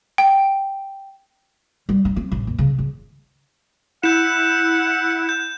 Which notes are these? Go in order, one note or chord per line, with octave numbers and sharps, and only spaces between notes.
G5
G3
D4
C4
A1
D#2
C#3
C#3
E4 F#5 G6 E7
G6